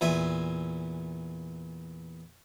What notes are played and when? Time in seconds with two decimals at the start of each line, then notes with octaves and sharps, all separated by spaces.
0.01 E2 A#2 E5 G#5